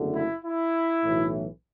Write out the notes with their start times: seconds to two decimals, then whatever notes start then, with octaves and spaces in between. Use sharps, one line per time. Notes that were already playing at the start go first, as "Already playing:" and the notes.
Already playing: F#1 E2 D3 A3
0.14 E4
0.44 E4
1.03 B1 A2 E3